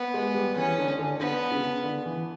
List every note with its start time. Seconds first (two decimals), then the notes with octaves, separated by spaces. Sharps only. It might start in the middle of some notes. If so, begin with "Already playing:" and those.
Already playing: B3
0.14 G#3
0.34 G3
0.56 E3 C#4
0.78 D3
0.99 D3
1.20 D3 B3
1.51 C#3
1.83 D3
2.06 E3